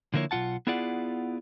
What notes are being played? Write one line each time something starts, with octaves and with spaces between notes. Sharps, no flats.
D3 F3 A#3 E4 C#5
B1 A#2 F4 F#5 A5
B3 E4 F4 G#4 D5 F#5